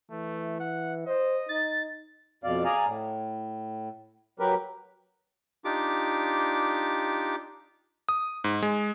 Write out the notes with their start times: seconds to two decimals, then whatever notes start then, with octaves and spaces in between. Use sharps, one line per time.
0.11 E3 A3
0.60 F#5
1.07 C5 D#5
1.49 D#4 A6
2.44 F2 B2 D5 F5
2.65 G#4 D5 F5 G#5 A#5
2.85 A2
4.39 F#3 G4 A#4 B4
5.65 D4 D#4 F4 G4 D6
8.09 D#6
8.44 G#2
8.62 G#3